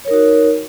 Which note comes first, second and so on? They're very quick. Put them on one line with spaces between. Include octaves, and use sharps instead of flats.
C#5 A#4 D#4 F#4